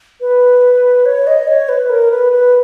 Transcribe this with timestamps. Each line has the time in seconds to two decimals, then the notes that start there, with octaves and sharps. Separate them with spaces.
0.21 B4
1.06 C#5
1.27 D#5
1.48 C#5
1.69 B4
1.90 A#4
2.11 B4
2.32 B4